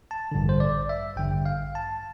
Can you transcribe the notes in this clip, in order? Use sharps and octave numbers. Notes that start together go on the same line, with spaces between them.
A5
A1 G2 D3
C5
D5
E5
A1 G2 D3 G5
F5
A5